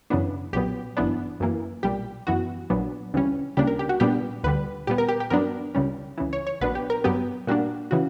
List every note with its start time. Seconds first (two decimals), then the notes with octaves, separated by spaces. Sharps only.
0.10 F#2 C#3 E3 B3 D4
0.53 B1 A#2 F#3 B3 G4
0.97 G1 F#2 E3 B3 D4
1.40 F#2 E3 A#3
1.83 B1 A#2 G3 G4
2.27 F#2 E3 B3 F#4
2.70 A#1 A#2 F#3 B3 D4
3.13 D2 C#3 E3 G3 C#4
3.57 C#2 C#3 G3 A#3 D4 G4
3.67 A#4
3.79 G4
3.89 F#4
4.00 A#2 G3 B3 D4 G4
4.44 D2 D3 G3 B4
4.87 A#2 G3 B3 G4
4.98 A#4
5.08 G4
5.20 G4
5.30 G2 F#3 B3 D4 A#4
5.75 C#2 C#3 G3 C#4
6.18 C#2 C#3 E3
6.33 C#5
6.47 C#5
6.61 A#1 A#2 F#3 B3 D4 B4
6.75 G4
6.90 A#4
7.04 G2 F#3 B3 G4
7.47 A#2 G3 A#3 D4 F#4
7.91 C#3 E3 F#4